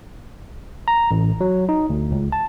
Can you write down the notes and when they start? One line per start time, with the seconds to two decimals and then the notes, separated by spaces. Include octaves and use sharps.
0.88 A#5
1.11 A1
1.41 F#3
1.69 D#4
1.90 D2
2.11 C#2
2.32 A5